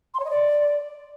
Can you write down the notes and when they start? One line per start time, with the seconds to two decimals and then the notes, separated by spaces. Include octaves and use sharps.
0.14 C6
0.19 C#5
0.25 D#5
0.30 D5